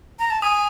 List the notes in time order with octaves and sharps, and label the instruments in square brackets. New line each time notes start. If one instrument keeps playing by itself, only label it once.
[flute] A#5
A5
[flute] G#5 [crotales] D#6